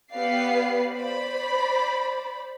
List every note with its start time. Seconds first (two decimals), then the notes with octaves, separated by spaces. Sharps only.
0.11 B3 G4 B4 D5 F5 C7
0.93 C5 D5 B5